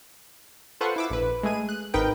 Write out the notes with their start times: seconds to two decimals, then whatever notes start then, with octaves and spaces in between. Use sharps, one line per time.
0.81 F4 A4 B4 C5 F#5 C#6
0.96 E4 D6 E6
1.10 A#1 B4
1.43 G#3 A3 G#4 D#7
1.69 F#6
1.94 G#1 G#2 D#4 A#4 B4 G5